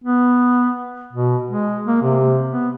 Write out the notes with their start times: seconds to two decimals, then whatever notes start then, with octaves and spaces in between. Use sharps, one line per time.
0.04 B3
1.13 B2
1.50 G#3
1.87 A#3
2.02 C3
2.50 B3